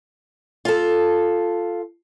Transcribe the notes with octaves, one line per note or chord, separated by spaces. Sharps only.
F4 A4